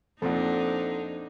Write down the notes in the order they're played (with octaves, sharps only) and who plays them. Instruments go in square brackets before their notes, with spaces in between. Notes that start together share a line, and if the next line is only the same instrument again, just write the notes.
[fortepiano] F2 A#2 [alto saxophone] C4 [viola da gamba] D4 D#4 [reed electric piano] A4 F#5